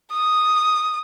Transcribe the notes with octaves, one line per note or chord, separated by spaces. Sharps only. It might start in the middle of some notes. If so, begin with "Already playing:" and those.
D#6